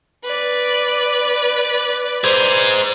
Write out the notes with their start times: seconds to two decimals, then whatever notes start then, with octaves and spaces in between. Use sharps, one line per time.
0.24 B4 D5
2.24 G#4 C5